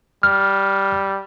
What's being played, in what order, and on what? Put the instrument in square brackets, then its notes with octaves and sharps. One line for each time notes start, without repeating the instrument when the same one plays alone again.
[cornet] G3 [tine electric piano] F6